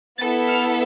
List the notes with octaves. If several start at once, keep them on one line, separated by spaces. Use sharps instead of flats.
B3 E4 A4 A6
F6